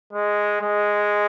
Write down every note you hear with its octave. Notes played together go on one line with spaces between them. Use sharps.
G#3
G#3